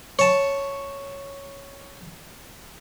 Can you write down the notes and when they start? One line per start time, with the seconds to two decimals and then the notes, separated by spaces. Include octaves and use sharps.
0.19 C#5 A5